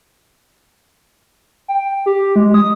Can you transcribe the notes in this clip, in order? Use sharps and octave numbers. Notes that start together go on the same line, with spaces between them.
G5
G4
G#3
D#6